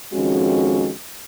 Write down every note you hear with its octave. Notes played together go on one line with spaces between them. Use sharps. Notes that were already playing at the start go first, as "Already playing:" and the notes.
F2 D#3 G#3 C#4 F#4